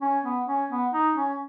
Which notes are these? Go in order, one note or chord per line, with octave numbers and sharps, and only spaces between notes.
C#4
B3
C#4
B3
D#4
C#4